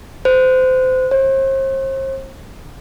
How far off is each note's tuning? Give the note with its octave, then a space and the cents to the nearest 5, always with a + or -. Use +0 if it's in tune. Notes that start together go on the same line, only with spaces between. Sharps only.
C5 -25
C5 +40